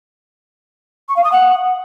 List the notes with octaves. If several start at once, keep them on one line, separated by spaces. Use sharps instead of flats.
C#6
F5
D#6
F#5